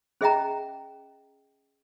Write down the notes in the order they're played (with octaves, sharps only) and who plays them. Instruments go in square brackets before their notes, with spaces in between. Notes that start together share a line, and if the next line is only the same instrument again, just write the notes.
[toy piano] C#4 G#4 D#5 E5 G5 A#5